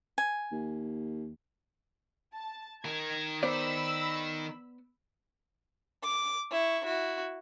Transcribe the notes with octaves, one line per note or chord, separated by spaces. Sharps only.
G#5
D#2
A5
D#3 A#4 G#6
B3 C5 D5 B5 E6
D6
E4 C#6
E4 F#4